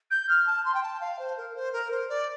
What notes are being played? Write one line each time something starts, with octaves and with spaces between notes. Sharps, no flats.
G6
F6
A5
C6
G5
A5
F5
C5
A#4
C5
A#4
C5
D5